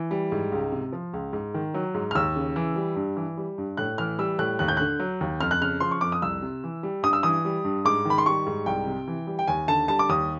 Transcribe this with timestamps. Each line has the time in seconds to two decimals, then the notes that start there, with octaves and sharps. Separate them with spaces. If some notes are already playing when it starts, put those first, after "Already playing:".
Already playing: E3
0.11 G3
0.32 G#2
0.52 C#2
0.72 C3
0.92 F3
1.13 C#2
1.33 G#2
1.54 D#3
1.74 F#3
1.94 G#2
2.11 F6
2.15 D#2 E6
2.36 C#3
2.56 E3
2.76 G3
2.96 G2
3.17 E3
3.37 G3
3.58 G2
3.77 A2 F#6
3.98 E3 F6
4.19 G3 E6
4.39 A2 F#6
4.59 D#2 F#6
4.68 G6
4.77 D3 F#6
4.99 F#3
5.21 D#2
5.41 F2 F6
5.51 F#6
5.61 C#3 F6
5.80 F3 C6
5.91 C#6
6.01 F2 D6
6.12 D#6
6.22 C2 E6
6.42 C3
6.64 E3
6.83 G3
7.03 G2 D#6
7.13 E6
7.23 E3 D#6
7.45 G3
7.65 G2
7.85 G#2 D6
8.05 D#3 B5
8.18 C6
8.26 G3 C#6
8.47 G#2
8.66 C2 G5
8.87 C3
9.08 E3
9.27 G3
9.39 G5
9.48 D#2 G#5
9.68 D3 A5
9.88 G3 A5
9.99 D6
10.09 D#2 D#6